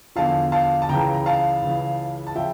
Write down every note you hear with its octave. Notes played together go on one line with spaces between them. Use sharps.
E2 D3 F3 F5 A5
F5 A5
A5
C#2 C#3 E3 G5 A#5
A#5
F5 A5
C#2 C#3 E3
A5
C#3 F3 E5 G5